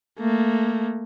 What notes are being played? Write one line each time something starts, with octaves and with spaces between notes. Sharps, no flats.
A3 A#3